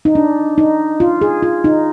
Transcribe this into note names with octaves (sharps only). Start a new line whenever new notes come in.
D#4
D4
D#4
F4
G#4
F4
D#4